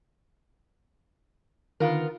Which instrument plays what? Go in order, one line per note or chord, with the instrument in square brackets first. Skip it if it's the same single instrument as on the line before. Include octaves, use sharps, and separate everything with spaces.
[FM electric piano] D3 D#3 [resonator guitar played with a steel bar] B3 F4 A#4